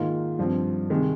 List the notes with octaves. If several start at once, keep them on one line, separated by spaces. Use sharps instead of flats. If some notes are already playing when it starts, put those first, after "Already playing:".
Already playing: G#2 D#3 A#3 F4
G2 F3 C4
C3 D#3 G#3